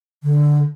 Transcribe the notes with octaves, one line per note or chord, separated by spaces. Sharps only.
D3